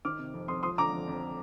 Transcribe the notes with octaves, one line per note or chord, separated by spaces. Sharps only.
D#3 D6 F6
C3
F2
F2 C6 D#6
F3 C6 D#6
D3 A#5 D6
F2
F2